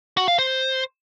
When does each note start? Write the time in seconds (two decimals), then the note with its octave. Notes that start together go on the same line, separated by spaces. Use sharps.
0.17 F#4
0.28 F5
0.39 C5